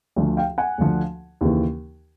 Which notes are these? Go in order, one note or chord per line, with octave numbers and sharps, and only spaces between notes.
D2 D3 F3
F5 G5
F#5 G#5
D2 D3 F3
D#2 C#3 E3